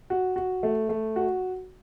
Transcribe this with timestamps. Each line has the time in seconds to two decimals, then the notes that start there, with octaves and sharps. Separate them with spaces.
0.10 F#4
0.36 F#4
0.63 A3
0.89 A3
1.16 F#4